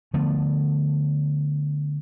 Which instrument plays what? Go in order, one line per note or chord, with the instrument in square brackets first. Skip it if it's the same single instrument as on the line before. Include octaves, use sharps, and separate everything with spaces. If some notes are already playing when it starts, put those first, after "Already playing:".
[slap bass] D3 F3 A3 B3